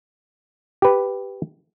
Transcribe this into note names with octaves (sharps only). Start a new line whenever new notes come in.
G4 B4